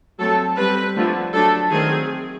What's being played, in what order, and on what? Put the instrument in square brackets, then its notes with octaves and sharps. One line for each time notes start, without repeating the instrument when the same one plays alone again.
[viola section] F#3 A3 C4 A4
G3 C4 B4
D3 F3 A3
F#3 A3 D4 A4
D#3 F#3 A3 C4 G#4